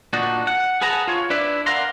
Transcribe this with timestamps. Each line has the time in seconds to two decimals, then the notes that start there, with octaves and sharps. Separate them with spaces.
0.13 A#2 D4 D#4 F#4
0.47 F#5
0.81 G#4 B4 F#5 A5 A#5
1.08 F4 C#5
1.30 D4 E4 B4 D5 E5
1.66 A#4 D5 F5 F#5 A#5 C6